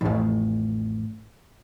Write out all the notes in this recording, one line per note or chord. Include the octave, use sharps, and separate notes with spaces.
A1 F2